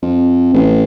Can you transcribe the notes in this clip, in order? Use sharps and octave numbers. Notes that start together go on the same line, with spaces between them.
F2
A1